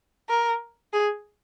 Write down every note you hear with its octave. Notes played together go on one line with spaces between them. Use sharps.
A#4
G#4